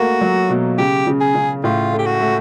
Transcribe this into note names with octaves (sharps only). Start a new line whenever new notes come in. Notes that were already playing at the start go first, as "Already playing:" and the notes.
Already playing: A3 A#3 F#4
F#3
B2
C#3 G4
C#3
G#4
C#3
A2 F4
A3
G4
F#4
A3